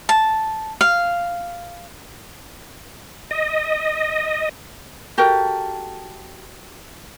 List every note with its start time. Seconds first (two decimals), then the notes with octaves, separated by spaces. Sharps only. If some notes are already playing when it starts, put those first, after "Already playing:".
0.09 A5
0.81 F5
3.31 D#5
5.18 F#4 G4 A4 A#4